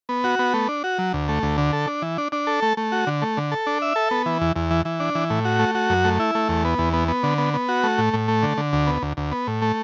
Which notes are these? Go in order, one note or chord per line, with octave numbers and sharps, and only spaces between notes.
B3
F#4
B3
A3
D4
F#4
F#3
D2
A3
D2
D3
A4
D4
E3
D4
D4
A4
A3
A3
F#4
D3
A3
D3
A4
D4
E5
A4
B3
E3
E2
E2
E3
E3
D4
E3
A2
F#4
A3
F#4
F#2
A3
E4
A3
E2
B3
E2
B3
B3
D3
B3
B3
F#4
A3
A2
A2
A3
D3
D3
D2
B3
D2
D2
B3
A2
A3